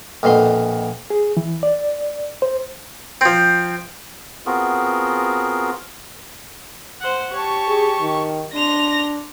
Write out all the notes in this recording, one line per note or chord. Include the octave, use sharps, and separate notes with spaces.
A#1 F2 B2 C6
G#4
E3
D5
C5
F3 C4
B3 C4 F4 F#4 G#4 A#4
C5 F#5
G4 C#5 A5 C#6
G#4
D#3
D4 C6 A#6 F7